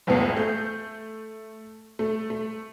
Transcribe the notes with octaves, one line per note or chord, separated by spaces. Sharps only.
F#1 C#2 A2 B3 A5 C7
A3 G6
A3
A3